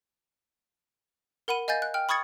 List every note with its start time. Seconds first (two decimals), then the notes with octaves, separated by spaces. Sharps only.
1.48 A#4 F#5 B5 D#7
1.68 D#5 F5 G#5 G6 A6
1.82 F#6
1.94 G5 F6
2.09 B5 C#6 D#6 G#6 A6 C#7